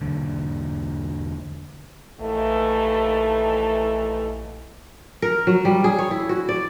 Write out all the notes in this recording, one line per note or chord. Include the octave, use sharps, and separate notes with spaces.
E1 D3
A#1 D#2 E3 A3
A#4
F#3
G3
G#4
C#5
E4
F#4
D5